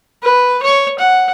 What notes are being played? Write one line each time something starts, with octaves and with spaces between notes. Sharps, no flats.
B4
C#5
F#5